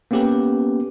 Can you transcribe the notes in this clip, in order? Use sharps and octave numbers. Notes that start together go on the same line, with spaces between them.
A#3 B3 C#4 G4 A4 B4